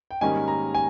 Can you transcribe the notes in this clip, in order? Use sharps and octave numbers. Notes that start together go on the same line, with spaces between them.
G5
G#2 D#3 G3 A#3 C#4 G#5
A#5
G#5